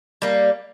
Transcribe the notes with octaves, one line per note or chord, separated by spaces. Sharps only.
G3 A#3